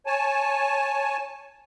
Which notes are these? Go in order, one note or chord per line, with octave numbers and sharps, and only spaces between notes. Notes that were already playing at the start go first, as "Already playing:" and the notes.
C#5 G#5 A5